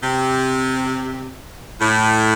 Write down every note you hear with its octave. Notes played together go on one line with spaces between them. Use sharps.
C3
A2